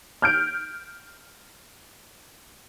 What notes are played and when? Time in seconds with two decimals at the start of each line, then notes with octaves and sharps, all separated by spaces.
0.22 F6 G6 D7